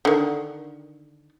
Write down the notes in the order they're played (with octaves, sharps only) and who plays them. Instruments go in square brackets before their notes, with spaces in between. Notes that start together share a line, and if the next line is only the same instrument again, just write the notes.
[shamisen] D3 D#3